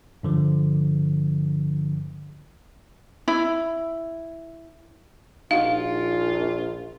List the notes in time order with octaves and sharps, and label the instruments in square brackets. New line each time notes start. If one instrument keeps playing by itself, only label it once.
[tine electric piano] G2 D3 F3
[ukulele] E4
[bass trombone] A#1 [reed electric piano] D#4 F#4 [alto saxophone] F4 [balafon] F5